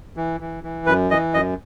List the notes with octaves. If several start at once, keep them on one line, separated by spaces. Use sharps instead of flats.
E3
E3
E3
F#2 B4
E3 D#5
F#2 D#5